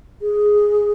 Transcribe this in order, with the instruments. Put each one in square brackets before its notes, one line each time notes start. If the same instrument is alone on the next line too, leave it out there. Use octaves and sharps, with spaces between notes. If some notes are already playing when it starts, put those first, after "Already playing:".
[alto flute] G#4